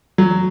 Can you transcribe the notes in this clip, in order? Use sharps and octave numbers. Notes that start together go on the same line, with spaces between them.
F#3